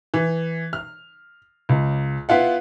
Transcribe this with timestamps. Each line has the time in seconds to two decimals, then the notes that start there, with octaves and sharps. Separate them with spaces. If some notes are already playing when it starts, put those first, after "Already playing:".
0.14 E3
0.73 F6
1.69 C#2
2.29 B3 E4 F4 F#5